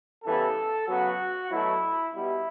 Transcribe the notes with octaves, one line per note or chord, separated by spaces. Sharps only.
C#3 E3 G3 B3 A4
C#3 F#3 B3 F#4
B2 F#3 A3 E4
B2 G3 B3 E4